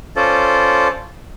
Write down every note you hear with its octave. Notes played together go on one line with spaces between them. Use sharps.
C#4 F4 A4 C5 D5